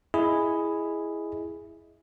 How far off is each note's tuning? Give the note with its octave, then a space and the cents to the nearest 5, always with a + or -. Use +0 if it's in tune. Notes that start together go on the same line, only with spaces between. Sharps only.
E4 +5 G#4 +0 D#5 +0